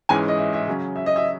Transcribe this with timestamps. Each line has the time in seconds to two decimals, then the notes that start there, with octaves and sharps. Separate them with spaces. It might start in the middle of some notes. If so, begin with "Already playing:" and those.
0.09 G#2 E3 G#3 C#4 G#5
0.28 D#5
0.38 E5
0.53 E5
0.67 C#3 F#3 C#4
0.96 E5
1.06 D#5
1.16 E5